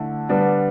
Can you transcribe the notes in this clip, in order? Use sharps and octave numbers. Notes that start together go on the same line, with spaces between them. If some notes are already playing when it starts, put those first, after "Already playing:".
Already playing: D3 A3 E4
D3 G3 B3 D4